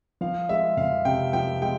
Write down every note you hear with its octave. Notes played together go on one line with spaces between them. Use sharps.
F3 F5
G#3 E5
F2 F5
C3 G5
F3 G5
G#3 G5